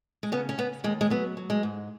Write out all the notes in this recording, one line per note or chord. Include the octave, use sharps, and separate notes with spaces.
G#3
C#3 B3
C#4
C#3 B3
D#2 G#3
G#3
F#3 B3
F#3
G#3
G#2